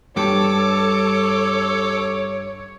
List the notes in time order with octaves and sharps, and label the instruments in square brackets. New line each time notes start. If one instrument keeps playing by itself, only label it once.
[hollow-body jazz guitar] G2 [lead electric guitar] A4 [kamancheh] C#5 [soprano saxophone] D6